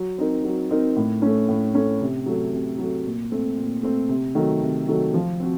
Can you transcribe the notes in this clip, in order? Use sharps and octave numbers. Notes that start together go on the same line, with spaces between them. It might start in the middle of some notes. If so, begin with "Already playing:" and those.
Already playing: F#3
C4 D#4 A#4
F#3
C4 D#4 A#4
A2
A3 C#4
A2
A3 C#4
C3
F#3 A3
C3
F#3 A3
A#2
A3 C4
A#2
A3 C4
C3
D#3 F#3 A3
C3
D#3 F#3 A3
F3
C4 F#4